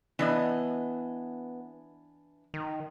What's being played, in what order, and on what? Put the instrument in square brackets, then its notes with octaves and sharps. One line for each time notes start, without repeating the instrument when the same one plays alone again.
[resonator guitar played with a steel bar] E3 D4 D#5 [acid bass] B3
[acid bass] D#3